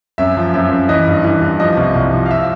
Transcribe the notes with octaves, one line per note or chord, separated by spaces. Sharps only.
F#2 E5
F3
F#2 E5
F#2
E3 D#5
G2
E3
G2
F3 D#5
C2
C2
F3
F5
E5